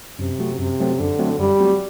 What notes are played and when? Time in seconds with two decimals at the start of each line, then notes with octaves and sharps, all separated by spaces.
0.19 F#2 C3
0.39 F#3 A3 C4 F#4
0.60 F#2 C3
0.80 F#3 A3 C4 F#4
0.99 F#2 D3
1.19 F#3 A3 C4 F#4
1.39 F#2 G3
1.60 F#3 A3 C4 F#4